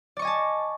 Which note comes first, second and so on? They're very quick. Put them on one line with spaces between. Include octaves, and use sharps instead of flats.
D5 C#6 D#5 G#5 A5